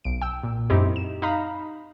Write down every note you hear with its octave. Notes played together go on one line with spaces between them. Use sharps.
B1 D7
G5 E6
A#2
F#2 C4 D#4 E4 G4
E7
D#4 F5 A#5 B5